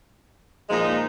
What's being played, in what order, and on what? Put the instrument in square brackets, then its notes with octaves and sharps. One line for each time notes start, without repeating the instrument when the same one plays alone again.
[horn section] A#2 F3 G#3 D#4